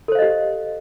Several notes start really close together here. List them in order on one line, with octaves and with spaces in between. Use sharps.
A4 C5 F5 D#5 G4